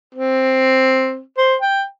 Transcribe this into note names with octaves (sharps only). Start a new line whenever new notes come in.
C4
C5
G5